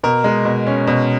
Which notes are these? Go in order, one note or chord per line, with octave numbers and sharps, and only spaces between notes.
B2 A#4
G#3
B2
C#4
B2